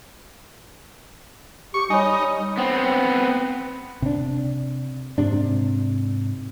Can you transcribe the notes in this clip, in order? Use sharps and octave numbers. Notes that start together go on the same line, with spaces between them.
G4 C#6
G3 D#4 C#5 G#5
B3 C4
C3 D4
G#2 C3 D4